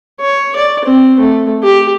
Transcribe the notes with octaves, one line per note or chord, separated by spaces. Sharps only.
C#5
D5
C4
A3
G4